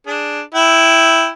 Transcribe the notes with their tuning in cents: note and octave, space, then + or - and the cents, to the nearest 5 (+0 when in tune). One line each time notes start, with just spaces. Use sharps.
D4 +0 G#4 +0
E4 +0 G5 +0